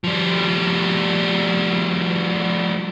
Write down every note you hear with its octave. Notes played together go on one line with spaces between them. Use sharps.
F3 G3